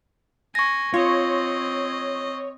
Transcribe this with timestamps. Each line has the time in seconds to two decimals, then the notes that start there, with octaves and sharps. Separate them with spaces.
0.55 G#5 C#6 A#6
0.94 C4 F4 C#5 D#5